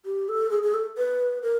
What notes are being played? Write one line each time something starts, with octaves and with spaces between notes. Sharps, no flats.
G4
A4
G#4
G#4
A4
B4
A#4